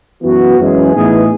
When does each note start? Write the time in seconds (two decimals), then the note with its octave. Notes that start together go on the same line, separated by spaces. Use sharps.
0.22 F#2 E3 B3 F#4
0.58 F#2 E3 G#3 C#4 G#4
0.93 A2 E3 B3 D#4 G#4